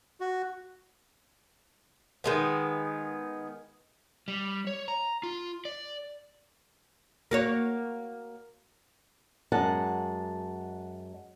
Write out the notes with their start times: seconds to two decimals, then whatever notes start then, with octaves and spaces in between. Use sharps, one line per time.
0.21 F#4
2.24 D#3 G#3 B3
4.28 G3
4.67 C#5
4.88 A#5
5.23 F4
5.65 D5
7.31 A#3 F#4 C#5
9.52 F#2 G#3 F#5 A5